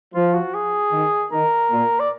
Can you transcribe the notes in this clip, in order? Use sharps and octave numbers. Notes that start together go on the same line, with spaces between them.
F3 F4
F#4
G#4
D#3
D#3 A#4
A#2
D5